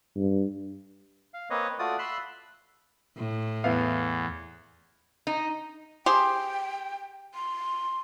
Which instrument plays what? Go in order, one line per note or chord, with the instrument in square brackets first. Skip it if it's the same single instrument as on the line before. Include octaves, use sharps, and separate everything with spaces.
[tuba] G2
[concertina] F5
A#3 C4 B4 C#5 D#5
A3 F4 F#4 D5 D#6
E5 B5 C6 E6 F#6
[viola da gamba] A2
[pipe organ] E2 [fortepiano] B3 E4 F5
[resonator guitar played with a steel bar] D#4
[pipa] G4 G#4 C5 [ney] G5
[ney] C6